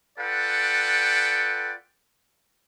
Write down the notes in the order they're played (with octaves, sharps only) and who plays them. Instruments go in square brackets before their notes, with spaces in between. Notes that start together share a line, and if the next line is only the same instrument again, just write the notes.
[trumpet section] F4 A4 B4 D5 F#5 G5